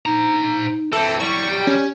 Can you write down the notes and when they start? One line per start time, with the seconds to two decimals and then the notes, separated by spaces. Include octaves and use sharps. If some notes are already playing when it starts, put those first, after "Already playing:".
0.06 D#4 C5 A#5
0.93 E3 C4 A4 E5
1.20 F#3 G3 E4 C#6
1.49 G4 G5
1.67 C#4